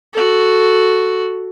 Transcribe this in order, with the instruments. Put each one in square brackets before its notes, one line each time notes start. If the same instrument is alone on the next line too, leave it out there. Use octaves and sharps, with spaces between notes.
[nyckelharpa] F#4 A4